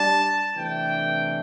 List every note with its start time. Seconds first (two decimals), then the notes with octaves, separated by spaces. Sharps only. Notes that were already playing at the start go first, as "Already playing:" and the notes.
Already playing: G3 D4 A5
0.56 C3 E3 A3 D4 G5